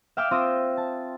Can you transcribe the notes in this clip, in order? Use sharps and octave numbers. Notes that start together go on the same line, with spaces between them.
E5 F5 G5 D6 E6 F6
C4 F4 E5 D#6 E6 A#6
A5